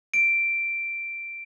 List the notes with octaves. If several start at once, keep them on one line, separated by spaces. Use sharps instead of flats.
D7